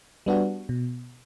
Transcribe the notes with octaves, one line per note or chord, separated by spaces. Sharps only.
G3 B3 D4 F#4
B2